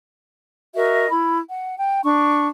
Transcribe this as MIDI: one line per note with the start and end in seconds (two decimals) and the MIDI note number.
0.75 1.09 66
0.75 1.09 70
0.75 1.09 75
0.75 1.09 76
1.10 1.39 64
1.10 1.39 83
1.50 1.77 78
1.77 2.02 79
2.03 2.47 62
2.03 2.47 85